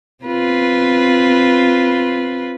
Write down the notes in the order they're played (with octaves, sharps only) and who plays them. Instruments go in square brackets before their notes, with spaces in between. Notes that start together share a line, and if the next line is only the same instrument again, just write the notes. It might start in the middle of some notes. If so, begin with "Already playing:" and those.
[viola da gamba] C4 F4 B4